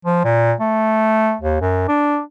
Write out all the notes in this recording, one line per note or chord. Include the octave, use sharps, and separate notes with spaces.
F3
A#2
A3
D#2
F#2
D4